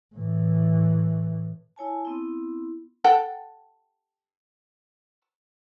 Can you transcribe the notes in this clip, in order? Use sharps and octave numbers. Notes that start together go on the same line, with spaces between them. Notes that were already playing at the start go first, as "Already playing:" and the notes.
A2 E3
E4 C#5 G#5 A5
B3 C4 E4
A4 F#5 G5